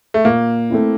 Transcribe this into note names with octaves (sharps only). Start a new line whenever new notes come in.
A3
A#2 A#3
A3 C4 E4